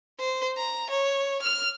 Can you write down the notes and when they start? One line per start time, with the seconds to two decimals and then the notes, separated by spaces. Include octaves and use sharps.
0.19 C5
0.57 A#5
0.90 C#5
1.42 F6